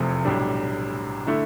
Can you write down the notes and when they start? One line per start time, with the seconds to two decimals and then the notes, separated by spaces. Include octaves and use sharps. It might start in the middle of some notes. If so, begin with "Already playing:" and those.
Already playing: F1 E2 C3 F3 A3
0.25 B1 A2 G3 D4
1.27 D3 A3 E4